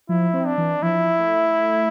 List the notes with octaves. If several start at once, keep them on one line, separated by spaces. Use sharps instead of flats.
F3 E4
C4
D4
E3
F3 E4
A3